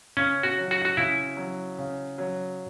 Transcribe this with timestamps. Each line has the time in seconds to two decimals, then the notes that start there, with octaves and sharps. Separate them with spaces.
0.17 C#3 C#4
0.43 F#4
0.58 F#3
0.71 F#4
0.85 F#4
0.97 C#3 E4
1.37 F#3
1.78 C#3
2.18 F#3